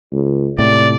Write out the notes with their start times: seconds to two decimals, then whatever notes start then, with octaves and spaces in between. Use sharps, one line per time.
0.12 C#2
0.59 A2 C3 D5